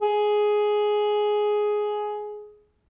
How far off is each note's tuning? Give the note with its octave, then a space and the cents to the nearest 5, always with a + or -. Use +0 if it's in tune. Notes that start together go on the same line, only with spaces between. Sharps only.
G#4 +10